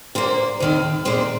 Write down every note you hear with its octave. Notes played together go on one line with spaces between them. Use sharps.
A#2 A#3 C5
D#2 D#3 C4
A#2 G#3 C4 C5